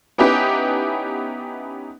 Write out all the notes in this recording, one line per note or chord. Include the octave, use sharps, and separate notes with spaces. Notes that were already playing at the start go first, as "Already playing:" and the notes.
B3 C#4 D#4 E4 G4 B4